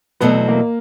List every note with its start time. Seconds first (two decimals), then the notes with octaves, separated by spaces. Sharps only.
0.20 E2 B2 F#3 A3 B3 C4
0.48 A#3